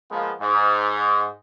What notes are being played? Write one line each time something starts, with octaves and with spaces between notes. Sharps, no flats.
F3 G#3 A#3 B3
G#2